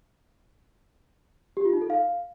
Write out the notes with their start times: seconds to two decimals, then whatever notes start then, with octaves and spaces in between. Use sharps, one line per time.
1.57 G4
1.65 F4
1.73 D#4
1.82 A4
1.90 F5